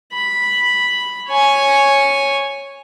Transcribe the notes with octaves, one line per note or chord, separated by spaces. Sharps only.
B5
C#5 G#5